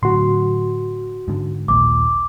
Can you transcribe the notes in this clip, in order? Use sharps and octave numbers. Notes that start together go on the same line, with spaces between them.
A2 D3 F#3 F#4 C6
G#2 D3
A#1 D#2 A#2 D6